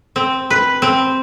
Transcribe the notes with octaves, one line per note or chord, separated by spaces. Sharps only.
C4
B4
C4